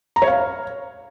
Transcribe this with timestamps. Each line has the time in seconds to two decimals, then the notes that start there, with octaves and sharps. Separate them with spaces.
0.16 A#5
0.22 C#5
0.27 F5